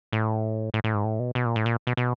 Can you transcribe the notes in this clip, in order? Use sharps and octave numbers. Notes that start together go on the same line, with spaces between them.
A2
A2
A2
G#2
A2
B2
B2
A#2
A2
A#2
B2
B2